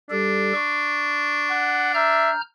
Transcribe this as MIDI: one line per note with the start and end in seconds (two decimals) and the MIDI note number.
0.11 0.53 55
0.11 2.35 62
0.11 0.53 67
0.11 0.53 69
0.55 1.51 85
1.51 1.94 78
1.94 2.31 76
1.94 2.41 82
1.94 2.41 89
1.94 2.41 91